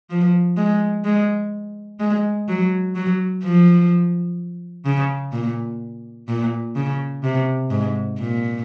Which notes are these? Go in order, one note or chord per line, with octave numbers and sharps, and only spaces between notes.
F3
G#3
G#3
G#3
F#3
F#3
F3
C#3
A#2
A#2
C#3
C3
G#2
A#2